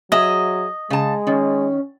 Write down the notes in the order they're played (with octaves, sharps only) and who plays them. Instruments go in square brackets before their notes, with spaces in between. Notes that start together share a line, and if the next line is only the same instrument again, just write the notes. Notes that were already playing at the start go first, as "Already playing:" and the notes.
[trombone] F#3 [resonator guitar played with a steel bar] G#4 E5 [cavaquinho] D#5
[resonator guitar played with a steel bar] C#3 A5 [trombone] G#3
[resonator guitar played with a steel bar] D#3 [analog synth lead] C#4